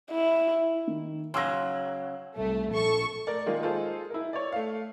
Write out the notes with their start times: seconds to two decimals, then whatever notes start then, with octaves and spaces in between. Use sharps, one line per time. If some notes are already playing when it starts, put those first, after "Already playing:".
0.11 E4
0.88 D#3
1.34 C#3 F#3 C6 E6 A#6
2.36 C2 A3
2.71 A#1 A4 C#6
3.27 A3 A#4 D5
3.46 D#3 G#3 A#3 F4 G#4
3.63 D#4 F4 G#4 A4 C5
4.10 E4 A#4
4.33 C#5 D5
4.52 A3 F5